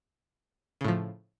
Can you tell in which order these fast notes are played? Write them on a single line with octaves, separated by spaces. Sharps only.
C#3 A2 F3